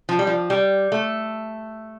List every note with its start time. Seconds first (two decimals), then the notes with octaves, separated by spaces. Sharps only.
0.09 F3
0.19 G3
0.27 F3
0.50 G3
0.92 A3